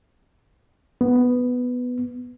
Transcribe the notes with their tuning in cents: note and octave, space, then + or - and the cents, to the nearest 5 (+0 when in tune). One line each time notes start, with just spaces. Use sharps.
B3 +5